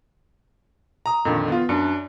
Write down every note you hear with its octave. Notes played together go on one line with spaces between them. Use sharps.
A#5 D#6
F2 A#2 D3 D#3
B3 F4
F#2 D4 C#7